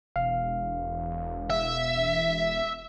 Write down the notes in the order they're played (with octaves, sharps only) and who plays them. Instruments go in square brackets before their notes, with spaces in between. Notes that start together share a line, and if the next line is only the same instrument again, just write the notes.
[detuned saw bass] E1 [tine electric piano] F5
[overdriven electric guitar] E5